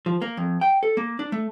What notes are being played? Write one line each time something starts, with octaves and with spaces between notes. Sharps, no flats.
F3
A#3
F2
G5
A4
A#3
D4
A3